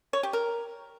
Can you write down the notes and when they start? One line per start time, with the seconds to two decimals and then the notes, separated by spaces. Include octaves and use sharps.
0.13 C#5
0.23 G4
0.33 A#4